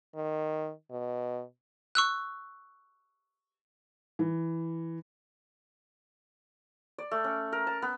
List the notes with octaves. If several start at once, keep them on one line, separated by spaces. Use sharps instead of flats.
D#3
B2
C#6 E6 F#6
E3
D5
A3
C#4
A#4
A5
B3